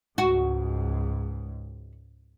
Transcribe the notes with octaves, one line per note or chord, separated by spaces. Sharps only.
C#2 G#2 F#4